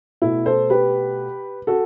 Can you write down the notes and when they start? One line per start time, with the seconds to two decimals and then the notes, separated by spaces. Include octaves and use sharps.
0.22 B2 A3 E4
0.46 A4 C5
0.70 G4 B4
1.67 F#4 A4